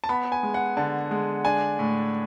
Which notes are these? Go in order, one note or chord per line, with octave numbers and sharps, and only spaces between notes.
A5
B3 B5
G#5
G#3
F#5
D3 A5
G#3
D4 G#5
A2